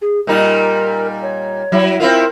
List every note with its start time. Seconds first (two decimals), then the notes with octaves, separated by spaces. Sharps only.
0.02 G#4
0.27 A#2 G3 D#4 A#4
1.23 C#5
1.72 F#3 E4
2.00 C4 E4 F4 A#4